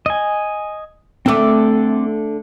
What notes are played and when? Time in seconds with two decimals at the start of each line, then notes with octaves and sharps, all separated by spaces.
0.06 D#5 G#5
1.26 D3 A3 C4 A4 D6